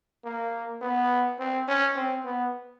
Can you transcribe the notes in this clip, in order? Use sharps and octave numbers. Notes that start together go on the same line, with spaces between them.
A#3
B3
C4
C#4
C4
B3